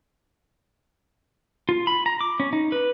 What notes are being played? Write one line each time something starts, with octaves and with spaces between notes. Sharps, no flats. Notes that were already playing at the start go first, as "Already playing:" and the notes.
F4
B5
A#5
D6
C#4
D#4
B4